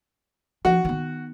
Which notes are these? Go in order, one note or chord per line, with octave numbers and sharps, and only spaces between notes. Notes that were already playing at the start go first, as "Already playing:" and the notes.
F3 F#4
D#3 B3